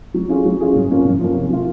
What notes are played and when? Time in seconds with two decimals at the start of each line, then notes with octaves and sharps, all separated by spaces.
0.14 F#3
0.29 C#4 F4 G#4
0.45 F#3
0.60 C#4 F4 G#4
0.75 F#2
0.91 F3 A#3 C#4
1.05 F#2
1.20 F3 A#3 C#4
1.35 C3
1.50 F#3 A#3 F4